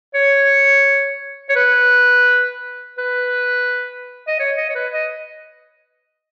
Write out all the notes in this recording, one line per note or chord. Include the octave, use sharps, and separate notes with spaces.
C#5
C#5
B4
B4
D#5
C#5
D#5
C#5
B4
D#5